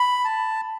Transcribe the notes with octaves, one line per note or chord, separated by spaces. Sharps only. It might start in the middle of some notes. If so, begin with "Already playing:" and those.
Already playing: B5
A5